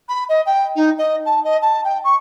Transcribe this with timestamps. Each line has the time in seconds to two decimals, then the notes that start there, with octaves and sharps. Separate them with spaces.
0.09 B5
0.29 D#5
0.46 G5
0.76 D#4
0.98 D#5
1.25 A5
1.44 D#5
1.62 A5
1.84 G5
2.04 C#6